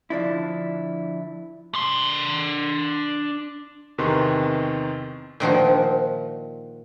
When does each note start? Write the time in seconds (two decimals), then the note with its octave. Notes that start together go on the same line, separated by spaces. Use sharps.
0.10 D3 F3 D4 E4
1.75 D4 C6
3.98 E2 C3 D#3 B4 C6 C#6
5.40 A#2 D#3 F3 F#4